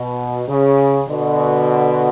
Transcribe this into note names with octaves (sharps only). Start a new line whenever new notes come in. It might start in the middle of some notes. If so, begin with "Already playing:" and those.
Already playing: B2
C#3
B2 D3